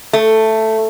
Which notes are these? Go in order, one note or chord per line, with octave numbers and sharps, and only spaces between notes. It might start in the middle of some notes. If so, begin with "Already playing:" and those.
A3